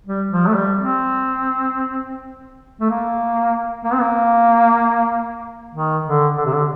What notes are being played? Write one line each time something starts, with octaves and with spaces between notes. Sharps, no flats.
G3
F3
A3
G3
C4
A3
A#3
A#3
C4
A#3
D#3
D3
D3
C3
D3